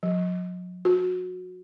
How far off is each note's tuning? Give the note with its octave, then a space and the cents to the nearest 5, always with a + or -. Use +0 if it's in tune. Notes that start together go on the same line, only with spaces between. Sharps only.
F#3 -45
F#4 -20